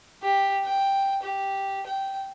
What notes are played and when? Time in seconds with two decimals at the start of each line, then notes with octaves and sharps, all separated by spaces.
0.23 G4
0.65 G5
1.23 G4
1.86 G5